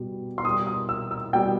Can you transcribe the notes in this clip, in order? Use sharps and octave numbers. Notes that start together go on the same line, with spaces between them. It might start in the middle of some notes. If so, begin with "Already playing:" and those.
Already playing: B2 G3
C6
B2 G3 D#6
D#6
E6
E6
B2 G3 G5